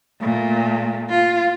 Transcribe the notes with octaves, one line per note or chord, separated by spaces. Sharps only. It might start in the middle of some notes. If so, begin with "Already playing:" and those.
A#2 A3
F4